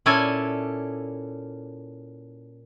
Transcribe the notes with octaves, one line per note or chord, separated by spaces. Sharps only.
A#2 C#4 E4 A4 D5 G#5